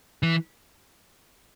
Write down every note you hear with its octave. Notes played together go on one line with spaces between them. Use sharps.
E3